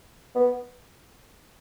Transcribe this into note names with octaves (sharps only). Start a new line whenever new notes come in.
B3